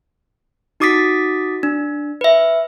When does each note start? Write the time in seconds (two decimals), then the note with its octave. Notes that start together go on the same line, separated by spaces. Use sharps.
0.80 D#4 F#4 D6 D#6 A6 B6
1.63 D4
2.21 B4 E5